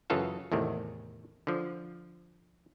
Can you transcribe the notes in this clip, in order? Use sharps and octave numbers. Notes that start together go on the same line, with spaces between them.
F#2 C#3 E3 F4 A4 F5
E2 A2 C3 D#3
D3 F3